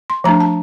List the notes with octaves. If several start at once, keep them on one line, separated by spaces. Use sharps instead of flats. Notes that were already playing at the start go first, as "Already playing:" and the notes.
C6
F3 A3 D4 A#5
A5